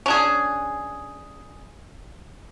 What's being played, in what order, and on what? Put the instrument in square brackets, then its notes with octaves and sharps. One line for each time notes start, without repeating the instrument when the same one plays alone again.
[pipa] C#4 D4 G#4